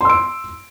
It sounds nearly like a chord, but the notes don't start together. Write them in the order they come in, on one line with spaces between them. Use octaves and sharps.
C6 E6 D7